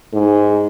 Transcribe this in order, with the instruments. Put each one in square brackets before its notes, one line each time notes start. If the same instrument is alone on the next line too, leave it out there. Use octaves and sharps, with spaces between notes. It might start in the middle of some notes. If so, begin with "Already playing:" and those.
[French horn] G#2